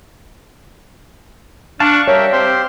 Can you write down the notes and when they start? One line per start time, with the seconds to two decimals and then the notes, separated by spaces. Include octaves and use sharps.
1.80 D4 F5 A5 C#6 F#6
2.08 G3 A#4 C#5 E5 G5
2.33 C4 G4 C5 C6